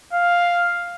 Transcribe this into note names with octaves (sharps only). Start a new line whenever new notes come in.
F5